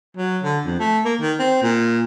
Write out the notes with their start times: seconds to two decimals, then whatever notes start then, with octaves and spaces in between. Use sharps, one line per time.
0.17 F#3
0.44 D3
0.66 F2
0.80 A3
1.05 A#3
1.21 D#3
1.39 C4
1.62 A#2